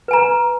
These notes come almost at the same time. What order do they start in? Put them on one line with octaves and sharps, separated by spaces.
B4 G#5 A#5